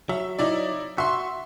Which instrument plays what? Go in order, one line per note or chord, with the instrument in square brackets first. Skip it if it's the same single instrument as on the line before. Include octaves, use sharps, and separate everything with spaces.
[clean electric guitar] F#3 [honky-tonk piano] E5
[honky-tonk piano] D#4 E4 D5
[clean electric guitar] F#4 [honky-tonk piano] E5 C6